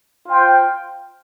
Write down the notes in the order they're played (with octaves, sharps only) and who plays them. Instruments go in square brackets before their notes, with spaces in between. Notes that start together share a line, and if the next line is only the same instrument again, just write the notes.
[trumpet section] F4 C5 G5